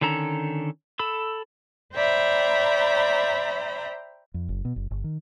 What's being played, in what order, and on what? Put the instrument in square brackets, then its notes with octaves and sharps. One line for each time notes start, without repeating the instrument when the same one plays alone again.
[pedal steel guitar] D3 D#3 C#4 A4 A#5
A4 B5 E6
[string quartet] C5 D5 E5 G5 A#5 B5
[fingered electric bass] F2
F#1
B2
F#1
G1
D#3